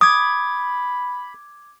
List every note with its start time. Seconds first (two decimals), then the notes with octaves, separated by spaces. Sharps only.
0.01 B5 D6 D#6 G#6